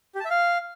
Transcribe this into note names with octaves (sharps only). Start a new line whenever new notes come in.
G4
A5
E5
F5